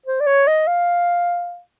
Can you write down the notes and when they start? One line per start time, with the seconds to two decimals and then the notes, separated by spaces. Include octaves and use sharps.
0.06 C5
0.20 D5
0.27 C#5
0.48 D#5
0.68 F5